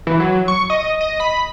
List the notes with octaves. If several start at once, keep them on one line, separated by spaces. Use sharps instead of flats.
E3
F#3
C#6
D#5
D#5
B5